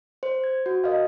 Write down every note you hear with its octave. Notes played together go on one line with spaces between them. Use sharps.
C5
G#6
F#4
A#4 D#5 F5